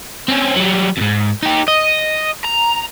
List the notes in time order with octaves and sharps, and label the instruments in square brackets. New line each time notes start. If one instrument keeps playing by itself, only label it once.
[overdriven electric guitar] C4 C#4
F#3 G3
F2 G#2
D#4 G4
D#5
A#5